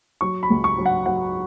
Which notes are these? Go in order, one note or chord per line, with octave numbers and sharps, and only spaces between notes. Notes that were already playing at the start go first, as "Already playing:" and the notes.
F#3 C#6
B5
C#2
C#6
F#3
F#5
F#3 F#5